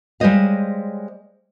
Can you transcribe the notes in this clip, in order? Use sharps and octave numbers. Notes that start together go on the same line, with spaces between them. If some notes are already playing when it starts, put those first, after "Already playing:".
G3 G#3 C5 C#5 D#5 F5